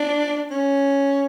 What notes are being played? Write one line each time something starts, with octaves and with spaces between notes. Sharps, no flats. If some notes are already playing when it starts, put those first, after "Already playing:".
Already playing: D4
C#4